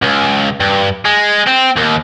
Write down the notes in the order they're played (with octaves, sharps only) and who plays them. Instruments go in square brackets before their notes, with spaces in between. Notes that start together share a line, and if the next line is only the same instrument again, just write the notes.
[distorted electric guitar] C#2
G2
G#3
C4
D#2